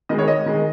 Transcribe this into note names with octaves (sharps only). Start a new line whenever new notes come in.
D#3 G#3 D#5
C#5
D#5
D#3 G#3